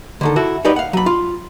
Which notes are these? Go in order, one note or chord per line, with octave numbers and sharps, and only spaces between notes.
D3 D#3 A4
E4 F#4 A4
D#4 F#4 G4 B4 D5 D#5
F5 F#5
F#3 B5
F4